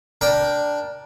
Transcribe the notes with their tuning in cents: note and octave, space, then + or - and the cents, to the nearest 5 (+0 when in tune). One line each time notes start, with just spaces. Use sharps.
D4 +0 A#4 +15 G5 +0